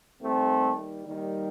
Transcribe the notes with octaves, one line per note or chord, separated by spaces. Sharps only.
D#2 D#3 G3 A3 C4
D#2 D#3 G3